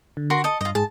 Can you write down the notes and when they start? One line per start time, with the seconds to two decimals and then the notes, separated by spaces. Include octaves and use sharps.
0.17 D3
0.30 F#4 A#4 C6
0.44 A4 D#5 D#6
0.61 G2 F4 D#5
0.75 G#2 G#4 A5